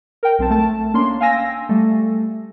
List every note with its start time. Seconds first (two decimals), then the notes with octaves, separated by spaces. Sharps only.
0.23 A#4 G5
0.38 B1 C4 A5
0.50 A3 A5
0.94 A#3 C#4 D4 C6
1.20 F5 G5 G#5 E6 A#6
1.69 G3 A3